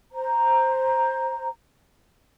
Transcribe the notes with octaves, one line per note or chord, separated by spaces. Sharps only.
C5 A#5